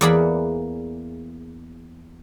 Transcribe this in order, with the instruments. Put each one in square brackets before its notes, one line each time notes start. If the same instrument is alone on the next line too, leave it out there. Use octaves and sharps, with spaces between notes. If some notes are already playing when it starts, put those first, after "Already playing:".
[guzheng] E2 A#3 G#4 D5 F#5 B5